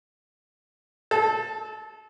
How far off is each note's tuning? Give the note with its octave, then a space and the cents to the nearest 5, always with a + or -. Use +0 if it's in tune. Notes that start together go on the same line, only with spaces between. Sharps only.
A4 -30 A5 +10